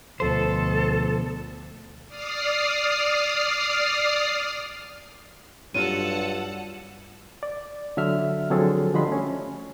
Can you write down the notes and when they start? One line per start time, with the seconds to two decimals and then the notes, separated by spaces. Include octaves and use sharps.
0.20 D2 B2 F3 A4 C5
2.08 D5 D#6 F6 C7
5.74 G2 F#3 D#4 F4 A4 F#5 D#7
7.43 D5
7.97 D3 F#3 E5 F6
8.51 D3 F3 F#3 C4 G#4 A4
8.94 D3 F3 G3 D#5 B5 C6
9.08 A3 C#4